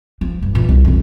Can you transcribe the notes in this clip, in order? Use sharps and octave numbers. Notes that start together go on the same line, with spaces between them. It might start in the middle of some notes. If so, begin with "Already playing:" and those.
F3
G2
A#2 E3
C2
F2 C#3